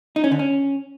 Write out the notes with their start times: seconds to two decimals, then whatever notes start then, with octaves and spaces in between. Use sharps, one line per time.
0.16 D#4
0.24 C#4
0.32 D3
0.39 C#4